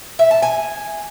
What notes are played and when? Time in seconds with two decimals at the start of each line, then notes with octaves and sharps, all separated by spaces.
0.19 E5
0.31 A5
0.42 G#5